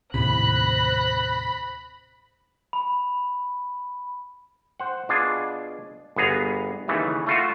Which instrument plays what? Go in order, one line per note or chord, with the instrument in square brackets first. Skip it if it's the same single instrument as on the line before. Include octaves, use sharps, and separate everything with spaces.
[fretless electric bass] D#2 A2 C3 [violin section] C5 F#6 A#6 [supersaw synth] B5
[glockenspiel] B5
[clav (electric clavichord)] C5 F#5
B2 D4 F4 G#4
G1 B3 G#4 A#5
D#2 C#3 E3 A3
A3 F4 F#4